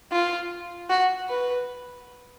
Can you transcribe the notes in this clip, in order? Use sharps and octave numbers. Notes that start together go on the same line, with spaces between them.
F4
F#4
B4